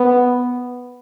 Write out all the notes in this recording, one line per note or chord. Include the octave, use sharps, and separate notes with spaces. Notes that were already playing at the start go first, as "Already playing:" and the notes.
Already playing: B3